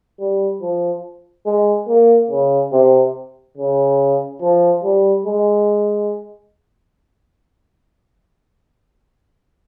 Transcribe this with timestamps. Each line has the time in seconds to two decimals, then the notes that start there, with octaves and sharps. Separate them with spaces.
0.20 G3
0.61 F3
1.46 G#3
1.88 A#3
2.30 C#3
2.72 C3
3.57 C#3
4.41 F3
4.84 G3
5.26 G#3